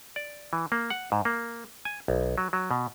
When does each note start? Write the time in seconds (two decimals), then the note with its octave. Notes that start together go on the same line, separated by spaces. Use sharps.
0.16 D5
0.53 E3
0.72 A#3
0.90 F#5
1.12 G#2
1.25 A#3
1.85 G#5
2.08 B1
2.38 F#3
2.53 F#3
2.71 B2